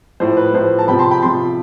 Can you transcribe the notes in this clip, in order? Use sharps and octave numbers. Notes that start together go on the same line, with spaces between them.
A2 F3 C5
B4
A2 F3 C5
A5
C3 F3 G5 B5
A5 C6
G5 B5
C3 F3 A5 C6